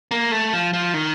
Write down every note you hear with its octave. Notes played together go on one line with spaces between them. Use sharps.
A#3
A3
F3
F3
D#3